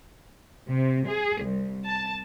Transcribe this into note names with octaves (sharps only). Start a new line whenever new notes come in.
C3
G#4
C2
A5